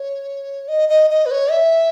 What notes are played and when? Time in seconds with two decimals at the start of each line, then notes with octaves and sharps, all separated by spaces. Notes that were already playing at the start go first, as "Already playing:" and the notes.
Already playing: C#5
0.68 D#5
0.89 D#5
1.10 D#5
1.26 B4
1.31 C#5
1.51 E5